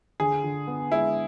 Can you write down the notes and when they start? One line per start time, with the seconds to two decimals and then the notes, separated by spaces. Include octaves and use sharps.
0.20 D3 G#4
0.44 D3
0.67 B3
0.91 G#3 E4